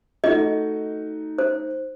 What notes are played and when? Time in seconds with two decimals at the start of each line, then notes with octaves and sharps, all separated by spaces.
0.24 A3 D#4 F#4 D#5
1.38 C5